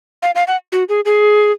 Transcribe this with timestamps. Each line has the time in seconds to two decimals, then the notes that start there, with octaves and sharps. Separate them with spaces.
0.23 F5
0.35 F5
0.48 F#5
0.72 F#4
0.89 G#4
1.05 G#4